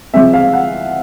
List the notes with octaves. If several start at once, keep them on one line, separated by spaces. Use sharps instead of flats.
C3 F3 G#3 C4 E5
F5
F#5